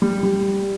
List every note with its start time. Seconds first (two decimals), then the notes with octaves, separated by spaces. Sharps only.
0.02 G3
0.23 G3